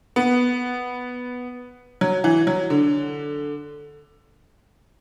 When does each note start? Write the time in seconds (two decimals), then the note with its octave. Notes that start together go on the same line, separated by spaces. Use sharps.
0.16 B3
2.01 F#3
2.24 E3
2.47 F#3
2.70 D3